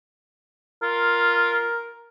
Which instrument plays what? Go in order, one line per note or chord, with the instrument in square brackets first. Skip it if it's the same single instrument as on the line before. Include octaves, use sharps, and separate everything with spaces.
[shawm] F4 [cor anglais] A#4